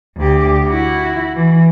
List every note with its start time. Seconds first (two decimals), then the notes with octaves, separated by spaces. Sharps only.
0.17 D2 G4
0.68 E4 F#4
1.35 E3